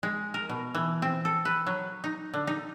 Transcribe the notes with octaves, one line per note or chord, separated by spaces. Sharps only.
G#3
A#4
B2
E3
C4
A4
B4
F#3
D#4
D3
D#4